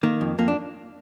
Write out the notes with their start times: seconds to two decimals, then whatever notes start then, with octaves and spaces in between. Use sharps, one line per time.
0.03 D#3 A#3
0.21 F2
0.38 F2 A#3
0.48 D4